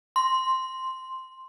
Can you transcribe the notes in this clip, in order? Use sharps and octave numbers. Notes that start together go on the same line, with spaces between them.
C6